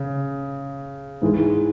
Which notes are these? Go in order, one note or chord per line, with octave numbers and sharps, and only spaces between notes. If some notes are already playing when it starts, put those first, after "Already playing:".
Already playing: C#3
G#2 E3 G#3